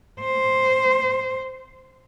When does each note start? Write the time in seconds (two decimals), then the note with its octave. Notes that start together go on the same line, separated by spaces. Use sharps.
0.20 C5